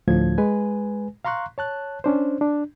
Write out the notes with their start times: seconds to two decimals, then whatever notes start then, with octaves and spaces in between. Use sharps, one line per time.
0.08 D2 A2 F3 G#6
0.38 G#3 B4 G#5
1.25 F5 A#5 C6 C#6 F#6
1.58 C#5 A5 F#6
2.04 C#4 D4 C5
2.41 D4